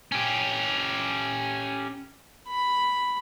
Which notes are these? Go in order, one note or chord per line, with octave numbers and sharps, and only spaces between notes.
C#4 G4
B5